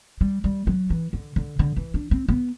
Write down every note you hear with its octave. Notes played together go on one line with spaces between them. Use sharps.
G3
G3
F#3
E3
D3
D3
D3
E3
D4
C4
B3